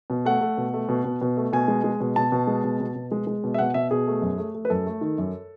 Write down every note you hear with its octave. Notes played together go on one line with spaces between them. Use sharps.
B2
A3 F#5
A3
B2
A3
B2
B2
B2
A3
B2 G#5
G#3
G#3
B2
B2 A5
B2
G#3
B2
B2
B2
G#3
G#3
B2
E5
B2 F#5
B2 E5
B2 G#4
A3
F#2
A3
A3
B4
F#2 A4
A3
D#3
F#2